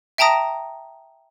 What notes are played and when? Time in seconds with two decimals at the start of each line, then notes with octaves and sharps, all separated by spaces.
0.18 E5 G5 A5 A#5 D#6 A#6